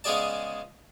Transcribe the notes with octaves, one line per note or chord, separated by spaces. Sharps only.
C#3 G#3 B3 G#4 D5 A5